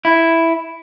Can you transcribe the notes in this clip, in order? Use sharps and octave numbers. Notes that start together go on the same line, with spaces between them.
E4